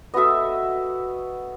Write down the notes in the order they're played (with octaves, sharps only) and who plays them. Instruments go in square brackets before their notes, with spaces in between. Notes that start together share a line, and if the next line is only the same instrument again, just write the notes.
[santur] B3 F#4 A4 [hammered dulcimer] D#5 E5